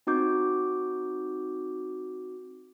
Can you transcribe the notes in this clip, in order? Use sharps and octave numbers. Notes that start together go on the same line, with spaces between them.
C4 D#4 F#4 D6 G6